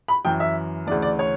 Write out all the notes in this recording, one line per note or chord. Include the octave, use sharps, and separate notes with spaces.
B5
F#2 E3 G5
E5
D2 C#3 E3 D5
D5
C#5